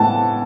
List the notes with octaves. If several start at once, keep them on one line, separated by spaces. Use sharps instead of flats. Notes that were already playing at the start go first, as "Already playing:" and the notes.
Already playing: A2 E3 F#5 A5